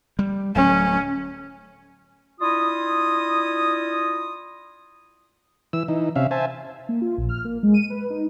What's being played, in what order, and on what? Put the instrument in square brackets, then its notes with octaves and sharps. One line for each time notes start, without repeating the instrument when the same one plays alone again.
[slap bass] G3
[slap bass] D1 F#3 A3 [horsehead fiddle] C#4
[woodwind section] D4 E4 F4 D#5 D#6
[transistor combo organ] E3 E6
E3 D#4
C3 C#4 E5 F5
C5 E5 G#5 A5
[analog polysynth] A#3
F4
A#1
F6
A#3
G#3
D#7
B4
D#4